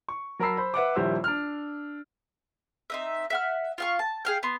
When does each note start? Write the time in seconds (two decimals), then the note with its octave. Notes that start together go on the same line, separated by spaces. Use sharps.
0.09 C#6
0.39 F#3 A#4 A5 B5 E6 C7
0.57 C5 B5
0.74 B4 E5 F#5 D6
0.96 D#1 A#1 G3 E4 C5 E6
1.24 D4 F6
2.90 C4 D#4 E5
3.30 E5 F#5 F6
3.78 F4 F5 C#6
3.99 A5
4.25 G#4 F5 G5
4.43 B3 C6